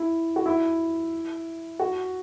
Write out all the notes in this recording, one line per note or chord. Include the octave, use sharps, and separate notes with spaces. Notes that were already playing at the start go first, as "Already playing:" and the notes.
Already playing: E4
F#4
E4
F#4